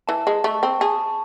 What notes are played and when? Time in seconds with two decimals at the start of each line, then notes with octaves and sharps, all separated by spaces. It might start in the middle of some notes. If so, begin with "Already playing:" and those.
0.07 E3 A5
0.27 G#3
0.44 A3 C#6
0.63 C4
0.80 G#4 A5